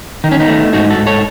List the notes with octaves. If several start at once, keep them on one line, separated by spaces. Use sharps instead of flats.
D#3 D#4
C#4
B3 D#4
A3
G#2 D#4 F#4
F#4 A4
G#2
A4 C#5